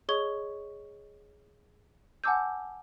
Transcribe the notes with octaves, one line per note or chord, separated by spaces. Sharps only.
G#4 C#5 D#5 C#6 G#6 G7
F#5 G#5 A5 D6 E6 G6